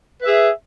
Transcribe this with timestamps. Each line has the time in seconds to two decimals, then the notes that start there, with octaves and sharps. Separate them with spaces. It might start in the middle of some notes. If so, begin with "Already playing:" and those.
0.22 B4
0.24 E5
0.27 G#4